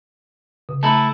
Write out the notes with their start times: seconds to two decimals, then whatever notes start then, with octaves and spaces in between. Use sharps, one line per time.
0.69 C#3
0.83 A3 E4 A5 A#5